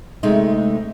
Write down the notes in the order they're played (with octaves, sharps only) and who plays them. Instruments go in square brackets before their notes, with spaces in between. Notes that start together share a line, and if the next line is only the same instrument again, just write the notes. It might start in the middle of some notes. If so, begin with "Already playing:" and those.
[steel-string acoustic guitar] D2 C3 G#3 A3 D#4